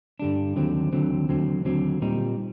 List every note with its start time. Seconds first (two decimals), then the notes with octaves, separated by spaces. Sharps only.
0.19 G2 D3 G3 D4
0.56 D#2 D3 F#3 C4
0.93 D#2 D3 F#3 C4
1.29 D#2 D3 F#3 C4
1.65 D#2 D3 F#3 C4
2.02 A#2 G3 C4 D#4